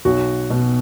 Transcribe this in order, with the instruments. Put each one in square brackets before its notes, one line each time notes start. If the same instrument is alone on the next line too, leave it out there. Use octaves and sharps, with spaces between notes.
[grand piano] B1 F#4
B2